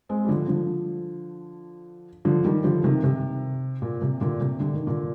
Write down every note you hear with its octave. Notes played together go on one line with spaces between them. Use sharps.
G#3 C4
G3
D3 F3
D3 F3
D3 F3
D#3 G3
D3 F3
C3 D#3
C3
A#2
C3
A#2 D3
C3
D3
D#3
A#2 D3